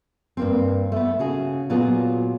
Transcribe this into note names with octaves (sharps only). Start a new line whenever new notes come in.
G2 A#3 C4
A3 B3
C#3 F#4 G#4
A#2 F#3 B3 F4 G#4